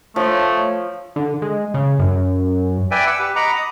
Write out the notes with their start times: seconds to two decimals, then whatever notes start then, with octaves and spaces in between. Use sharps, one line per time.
0.16 F3 A3 C#5
1.16 D3
1.42 G#3
1.74 C#3
1.99 F#2
2.91 B4 D5 E5 G5 G#5
3.07 F#5 D6 E6
3.19 G4 B4
3.36 D#5 F#5 A#5 B5 D6
3.56 D#6